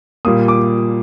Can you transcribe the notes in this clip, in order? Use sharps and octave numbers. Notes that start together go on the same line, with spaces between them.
A#2 G3 A#3 D#6
D6